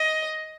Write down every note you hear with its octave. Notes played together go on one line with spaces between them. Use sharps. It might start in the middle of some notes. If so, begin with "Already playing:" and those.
Already playing: D#5